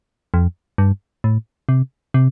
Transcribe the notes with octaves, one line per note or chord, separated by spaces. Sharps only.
F2
G2
A2
C3
C3